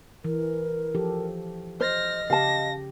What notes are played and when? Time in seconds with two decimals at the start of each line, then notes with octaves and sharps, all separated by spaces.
0.24 E3 A#4
0.95 F3 G4 A4
1.80 C5 D#5 F6 A#6
2.30 C#3 G4 F5 A5 A#6